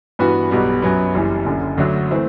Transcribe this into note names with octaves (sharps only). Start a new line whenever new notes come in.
G2 E3 B3 F#4 B4
B1 B2 G3 B3
F#2 F#3 B3
F#1 F#2 E3 G3
F#1 F#2 D3
D2 D3 F#3 A3
E3 A3 C4